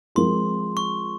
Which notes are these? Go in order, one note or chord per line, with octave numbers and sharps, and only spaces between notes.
F3 G#3 C4 F4 A#4 C6
C#6